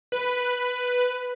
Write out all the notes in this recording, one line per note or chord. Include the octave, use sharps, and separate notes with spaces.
B4